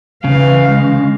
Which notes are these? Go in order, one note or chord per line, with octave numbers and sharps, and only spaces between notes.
C#3 E3 F5
G#3